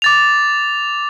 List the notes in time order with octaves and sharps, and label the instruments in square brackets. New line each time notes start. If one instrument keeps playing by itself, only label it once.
[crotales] D6 A6 F7